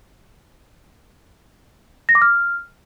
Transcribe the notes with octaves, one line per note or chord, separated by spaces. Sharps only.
A#6
D6
F6